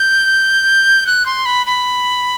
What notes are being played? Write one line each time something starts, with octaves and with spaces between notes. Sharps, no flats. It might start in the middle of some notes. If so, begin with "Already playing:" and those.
Already playing: G6
F#6
C6
B5
B5